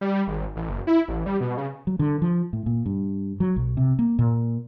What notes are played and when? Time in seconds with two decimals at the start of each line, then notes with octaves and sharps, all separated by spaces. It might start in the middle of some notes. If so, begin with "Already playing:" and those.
0.01 G3
0.27 G#1
0.56 A1
0.69 F#1
0.87 E4
1.08 A1
1.26 G3
1.40 B2
1.57 C#3
1.87 F#3
1.99 D3
2.22 F3
2.53 A2
2.66 A#2
2.86 G2
3.40 F#3
3.56 B1
3.77 C3
3.99 A#3
4.19 A#2